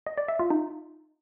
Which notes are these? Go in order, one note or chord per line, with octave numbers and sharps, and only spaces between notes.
D#5
D5
E5
F4
D#4